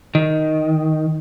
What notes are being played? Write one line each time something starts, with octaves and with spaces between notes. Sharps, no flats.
D#3